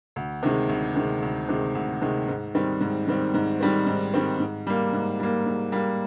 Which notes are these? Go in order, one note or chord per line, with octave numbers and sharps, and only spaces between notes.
D2
C3 D#3 G#3
D2
C3 D#3 G#3
D2
C3 D#3 G#3
D2
C3 D#3 G#3
G#2
D#3 G3 C4
G#2
D#3 G3 C4
G#2
D#3 G3 C4
G#2
D#3 G3 C4
G#2
G3 A#3
G#2
G3 A#3
G#2
G3 A#3